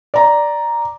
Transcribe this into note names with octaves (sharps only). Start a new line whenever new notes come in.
D5 A#5